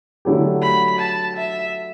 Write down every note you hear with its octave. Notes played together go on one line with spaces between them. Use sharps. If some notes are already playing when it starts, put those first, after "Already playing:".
D3 F#3 A3 E4 G4
B5
A5
E5